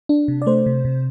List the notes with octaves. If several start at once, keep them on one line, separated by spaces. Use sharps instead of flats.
D4
C3
D5
A3 C5
C3
C3